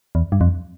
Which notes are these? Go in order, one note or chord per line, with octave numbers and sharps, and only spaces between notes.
E2
G2
F2